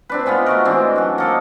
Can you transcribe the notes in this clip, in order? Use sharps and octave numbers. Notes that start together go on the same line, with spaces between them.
C4 D4 B4
G#3 B3 D#4 F4
A3 F#4 A#4
E3 G#3 C4 D4
F#2 F#5
A#3 A4 D#5